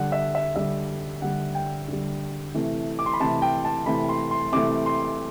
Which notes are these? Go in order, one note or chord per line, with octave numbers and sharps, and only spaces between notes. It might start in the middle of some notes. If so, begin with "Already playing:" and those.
Already playing: D3 G3 F#5
E5
E5
D3 G3 E5
D3 G3 F#5
G5
D3 G3
C3 E3 A3
D6
C6
B5
C3 E3 A3 A5
G5
A5
C3 E3 A3 B5
C6
C6
C3 E3 A3 D6
C6